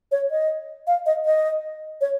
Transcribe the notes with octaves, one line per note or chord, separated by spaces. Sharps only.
C#5
D#5
F5
D#5
D#5
C#5